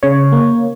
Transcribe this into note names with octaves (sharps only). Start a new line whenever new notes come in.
C#3 C#5
A#3